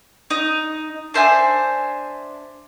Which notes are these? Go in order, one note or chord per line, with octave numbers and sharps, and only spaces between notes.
D#4
D4 C5 E5 G#5